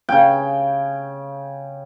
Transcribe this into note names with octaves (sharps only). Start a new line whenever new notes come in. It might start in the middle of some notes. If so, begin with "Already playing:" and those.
C#3 G5